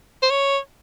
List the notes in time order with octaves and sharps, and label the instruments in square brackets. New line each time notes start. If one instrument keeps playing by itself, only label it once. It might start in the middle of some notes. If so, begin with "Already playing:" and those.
[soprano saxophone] C5
C#5